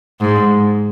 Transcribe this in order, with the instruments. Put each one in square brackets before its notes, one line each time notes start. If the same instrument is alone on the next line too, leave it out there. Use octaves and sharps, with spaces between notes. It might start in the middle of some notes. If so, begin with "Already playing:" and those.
[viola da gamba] G#2